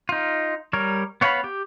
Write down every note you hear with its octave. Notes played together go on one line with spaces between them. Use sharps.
D#4 F4
G3 A#4 C#5
B3 C#5 F5 G5 B5
G4